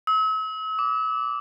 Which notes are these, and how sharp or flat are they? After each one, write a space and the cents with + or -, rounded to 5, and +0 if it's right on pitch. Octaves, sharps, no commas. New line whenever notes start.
E6 -40
D6 -15